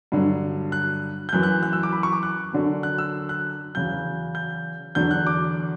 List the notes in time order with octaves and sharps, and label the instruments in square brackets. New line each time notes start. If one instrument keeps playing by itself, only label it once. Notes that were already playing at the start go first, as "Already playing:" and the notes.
[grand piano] G2 D3 F#3
F#6
G6
F#2 E3 F#6
F#6
F#6
E6
D6
B5
C#6
D6
F#6
F#2 D3 F#3
F#6
E6
F#6
E2 C#3 F#3 G6
G6
E2 D3 F#3 G6
F#6
D6